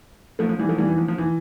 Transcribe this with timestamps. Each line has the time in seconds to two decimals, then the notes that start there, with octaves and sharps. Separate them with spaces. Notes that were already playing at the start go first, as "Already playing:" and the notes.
0.39 F3 A3
0.49 F3
0.59 E3 G3
0.69 F3 A3
0.78 E3 G3
0.89 E3
0.98 F3
1.08 F3
1.18 E3